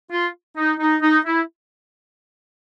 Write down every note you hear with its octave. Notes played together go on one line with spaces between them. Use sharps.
F4
D#4
D#4
D#4
E4